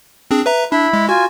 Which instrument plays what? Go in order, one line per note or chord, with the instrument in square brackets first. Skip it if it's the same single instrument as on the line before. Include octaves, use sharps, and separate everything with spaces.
[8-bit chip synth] C4 D4 G#4
B4 E5 A#5
[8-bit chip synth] D4 [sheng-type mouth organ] E4 B5
[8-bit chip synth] G#3
[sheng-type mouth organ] F4 G#5 [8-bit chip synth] F#4